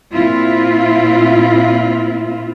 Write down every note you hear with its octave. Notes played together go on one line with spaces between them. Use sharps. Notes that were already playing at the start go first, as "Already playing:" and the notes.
A#2 C4 E4 F4